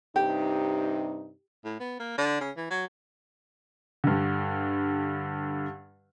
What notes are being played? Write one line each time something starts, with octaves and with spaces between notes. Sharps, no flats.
G2 C3 D#4 G4
A2
B3
A#3
D3
C#3
E3
F#3
G2 D3